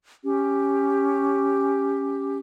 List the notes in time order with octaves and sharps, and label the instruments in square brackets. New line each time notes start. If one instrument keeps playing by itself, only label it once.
[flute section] C#4 G4